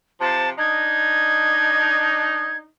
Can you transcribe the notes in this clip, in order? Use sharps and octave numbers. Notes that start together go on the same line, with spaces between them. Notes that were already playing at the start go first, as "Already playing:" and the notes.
C3 F3 A5
D4 D#4 G#6